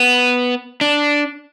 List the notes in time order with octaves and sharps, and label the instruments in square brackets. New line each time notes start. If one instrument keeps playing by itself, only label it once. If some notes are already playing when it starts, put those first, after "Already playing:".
Already playing: [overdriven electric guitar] B3
D4